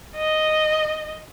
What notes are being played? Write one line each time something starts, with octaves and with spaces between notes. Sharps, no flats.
D#5